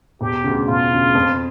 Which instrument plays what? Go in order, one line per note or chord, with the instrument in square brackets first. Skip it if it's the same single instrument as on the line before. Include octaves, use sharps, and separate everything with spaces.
[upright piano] E1 [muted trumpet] G4
[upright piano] D2 C#3
[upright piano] E1 [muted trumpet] F4
[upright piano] D2 C#3
F2